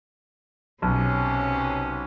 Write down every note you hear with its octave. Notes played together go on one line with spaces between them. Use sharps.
B1 C3 C#4 G4